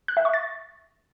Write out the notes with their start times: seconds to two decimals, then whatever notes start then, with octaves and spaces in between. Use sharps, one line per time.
0.08 F#6
0.17 E5
0.25 C#6
0.33 A6